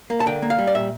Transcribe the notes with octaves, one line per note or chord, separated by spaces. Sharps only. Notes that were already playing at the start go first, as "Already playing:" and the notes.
A#3
A5
D3 G5
A#3
F5
G3
D5
A#2 E5